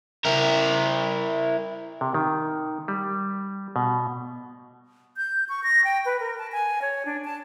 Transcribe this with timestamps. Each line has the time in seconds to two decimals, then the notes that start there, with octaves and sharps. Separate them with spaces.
0.25 E4 A#4
2.01 C3
2.14 D#3
2.88 G3
3.76 B2
5.17 G6
5.49 C#6
5.64 A#6
5.84 G5
6.06 B4
6.20 A#4
6.38 A5
6.52 G#5
6.82 C#5
7.06 D4
7.24 A5